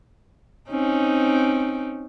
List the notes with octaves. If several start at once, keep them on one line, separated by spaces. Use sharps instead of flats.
C4 C#4 D#4